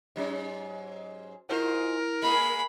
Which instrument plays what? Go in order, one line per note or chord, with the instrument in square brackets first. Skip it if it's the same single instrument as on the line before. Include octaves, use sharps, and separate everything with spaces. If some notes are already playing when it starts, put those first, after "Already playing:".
[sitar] G#2 F#3 C#4
[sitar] G#2 F4 C5 [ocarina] E4 [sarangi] A#4
[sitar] G#3 A#3 G#4 [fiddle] B5